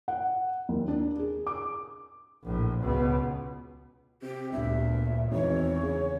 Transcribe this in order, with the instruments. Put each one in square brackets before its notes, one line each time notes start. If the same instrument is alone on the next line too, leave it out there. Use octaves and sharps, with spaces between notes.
[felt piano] F#5
D#2
D4
G#4
D6
[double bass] A#1 A2
C#2 B2
[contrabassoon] C3 [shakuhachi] G4
[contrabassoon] G1 [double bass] D2 A#2 [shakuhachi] E5
[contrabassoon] G#1 [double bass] E2 E3 [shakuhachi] C#5
[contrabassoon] C#3